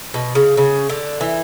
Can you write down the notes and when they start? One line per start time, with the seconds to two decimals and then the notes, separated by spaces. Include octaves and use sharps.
0.14 B2
0.35 C#3
0.57 C#3
0.89 D3
1.21 E3